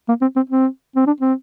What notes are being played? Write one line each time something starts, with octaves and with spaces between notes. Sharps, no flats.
A#3
C4
C4
C4
C4
D4
C4